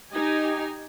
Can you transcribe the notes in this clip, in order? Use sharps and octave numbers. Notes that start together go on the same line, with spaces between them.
D#4 G4 G#5